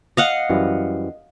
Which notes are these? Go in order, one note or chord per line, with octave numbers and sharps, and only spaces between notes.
D#5 F5 F#5
F#2 E3 G3